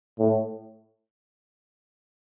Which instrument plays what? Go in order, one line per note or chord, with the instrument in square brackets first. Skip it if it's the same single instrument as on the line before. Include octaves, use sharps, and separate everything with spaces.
[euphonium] A2